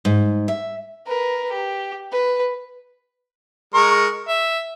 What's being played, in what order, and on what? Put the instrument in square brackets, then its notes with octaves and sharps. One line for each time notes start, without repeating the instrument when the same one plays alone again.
[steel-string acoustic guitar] G#2
E5
[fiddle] A#4 B4
G4
B4
[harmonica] G#3 A#4 C#6
E5